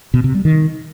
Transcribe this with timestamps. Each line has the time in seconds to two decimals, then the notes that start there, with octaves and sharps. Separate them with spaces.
0.14 B2
0.24 C3
0.34 G3
0.45 D#3